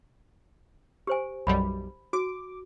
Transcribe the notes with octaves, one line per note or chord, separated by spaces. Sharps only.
G4 C5 G#5
B1 F#2 G3 B5
F#4 D6